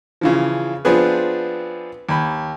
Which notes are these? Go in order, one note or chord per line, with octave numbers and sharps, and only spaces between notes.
C#3 E3 F3
F3 B3 C4 D4 G#4 B4
D#2 B5